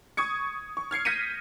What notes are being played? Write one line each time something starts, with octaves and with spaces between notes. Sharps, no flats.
C#6 D#6 G#6 C#7
C#6
F6 G#6 C7 C#7
G6 A#6 B6 C#7 D#7